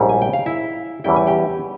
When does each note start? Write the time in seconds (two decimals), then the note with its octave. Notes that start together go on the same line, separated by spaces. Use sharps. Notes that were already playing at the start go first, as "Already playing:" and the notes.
Already playing: A#1 G#2 G3 C#4 E4 C#5
0.09 G#5
0.22 G5
0.33 F5
0.46 E4 E5
1.04 E2 E3 G3 C#4 E4 G5
1.16 G#5
1.27 G4 G5